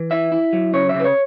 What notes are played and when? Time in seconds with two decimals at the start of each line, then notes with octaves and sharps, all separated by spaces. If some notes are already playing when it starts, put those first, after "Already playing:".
Already playing: E3
0.11 E4 E5
0.32 E4
0.53 F#3
0.73 C#3 C#5
0.89 E5
0.94 C#3
1.00 B4
1.04 C#5